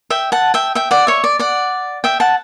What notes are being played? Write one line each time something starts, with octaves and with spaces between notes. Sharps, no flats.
E5 G5
F#5 A5
E5 G5
E5 G5
D5 F#5
C#5 E5
D5
D5 F#5
E5 G5
F#5 A5